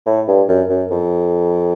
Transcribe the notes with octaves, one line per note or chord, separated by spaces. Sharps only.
A2
G2
F#2
F#2
F2